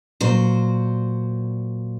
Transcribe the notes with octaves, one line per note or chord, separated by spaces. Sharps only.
A#2 F#3 C5